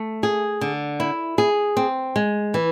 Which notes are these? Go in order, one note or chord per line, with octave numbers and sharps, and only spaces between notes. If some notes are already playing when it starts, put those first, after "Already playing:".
Already playing: A3
G#4
D3
E4
G#4
C4
G#3
E3